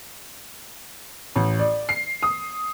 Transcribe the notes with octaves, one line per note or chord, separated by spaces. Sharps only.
A1
D5
C7
D#6